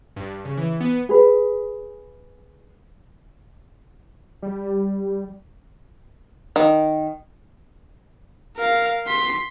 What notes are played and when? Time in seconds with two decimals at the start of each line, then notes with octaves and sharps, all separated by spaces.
0.16 G2
0.45 C#3
0.57 E3
0.81 B3
1.09 G#4 B4
4.42 G3
6.56 D#3
8.57 A#4 F5
9.07 C6 B6